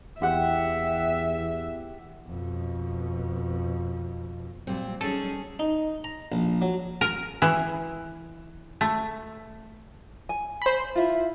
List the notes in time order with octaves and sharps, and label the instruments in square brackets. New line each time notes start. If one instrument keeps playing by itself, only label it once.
[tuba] E2 [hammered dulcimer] G4 F#5 [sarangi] E5
[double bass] F2 B2
[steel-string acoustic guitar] A#2 C4 [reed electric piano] F#3 G3
[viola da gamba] C#4 G#4 [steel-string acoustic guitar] D#4 [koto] A4
[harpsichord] D#4
A#5
A#1
F#3
[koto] A#4
E3
A3
[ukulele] G#5
[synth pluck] C5 B5
[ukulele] E4 F4